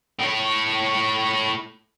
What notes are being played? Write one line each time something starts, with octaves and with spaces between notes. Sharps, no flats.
A2 C#5